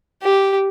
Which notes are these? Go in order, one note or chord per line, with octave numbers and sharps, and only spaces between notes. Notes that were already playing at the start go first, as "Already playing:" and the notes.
G4